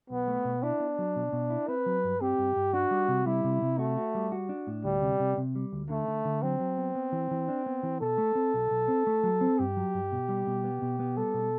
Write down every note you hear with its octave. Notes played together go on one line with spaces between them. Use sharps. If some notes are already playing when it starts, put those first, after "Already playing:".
B1 B3
A3
B2
D4 E4
B3
F#3
B2
B2
E4
C4 B4
F#3
G2
C4 G4
G2
G2
D4 F#4
G3
C3
G3 E4
C3
C3
A3 F#4
F#4
G3
F#4
D4
A2
D2 G3
C3
C3
C3
G3
D2
D3 A3
D3
D3
F#3 C4
F#3
B3
B3
E3
E3
D4
B3
E3
B2 A4
A3
C4
B1
B1
C4
A3
F#3
C4
G2 G4
F#3
G2
B2
G3
B2
B3
B2
B3
G3 A4
B2